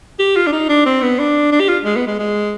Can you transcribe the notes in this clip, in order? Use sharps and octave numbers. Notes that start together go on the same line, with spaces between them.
G4
F4
D4
D#4
D4
C4
B3
D4
D4
G4
F4
G#3
B3
G#3
G#3